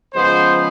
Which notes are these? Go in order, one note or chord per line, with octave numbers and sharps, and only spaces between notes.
C#3 F3 G#3 B3 C5